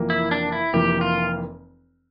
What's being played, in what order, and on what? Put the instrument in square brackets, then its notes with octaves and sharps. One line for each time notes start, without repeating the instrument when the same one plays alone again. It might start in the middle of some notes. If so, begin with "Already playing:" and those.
Already playing: [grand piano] F1 F2 E3 A#3
[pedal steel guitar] E4
D4
E4
[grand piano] F1 F2 E3 A#3 [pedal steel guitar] G4
[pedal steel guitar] F4